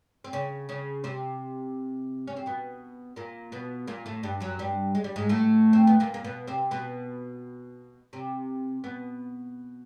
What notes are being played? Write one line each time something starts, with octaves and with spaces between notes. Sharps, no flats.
C4
C#3 C#4
C#3 C#4
C3 C4
C#4
C4
B2 B3
A#2 A#3
B2 B3
A#2 A#3
A2 A3
G2 G3
F#2 F#3
G2 G3
G#3
G3
G#2 G#3
A2 A3
C4
B3
A#2 A#3
A#3
B2 B3
C3 C4
B2 B3
C3 C4
B2 B3